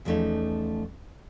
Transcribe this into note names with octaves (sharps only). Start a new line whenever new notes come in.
E2 F3 G3 A3 C#4 D#4